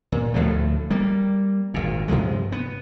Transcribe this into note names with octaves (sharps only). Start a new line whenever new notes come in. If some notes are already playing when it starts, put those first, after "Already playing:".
A#2
D2 A2 F3 A3
G3 A#3
G#1 A#2
G2 C3 F3 G#3
B3